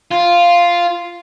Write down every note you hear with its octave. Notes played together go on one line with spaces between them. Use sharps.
F4